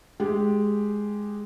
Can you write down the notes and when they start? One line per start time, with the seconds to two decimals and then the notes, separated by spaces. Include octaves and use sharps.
0.20 G#3 G4